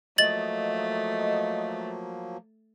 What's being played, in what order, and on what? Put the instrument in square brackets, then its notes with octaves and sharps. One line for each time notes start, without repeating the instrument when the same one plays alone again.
[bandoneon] F3 F#3 A#3 [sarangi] A3 [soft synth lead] D#5 [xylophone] A6 F#7